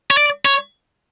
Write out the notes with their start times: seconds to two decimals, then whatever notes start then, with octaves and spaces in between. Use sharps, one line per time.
0.11 C#5
0.17 D5
0.45 C#5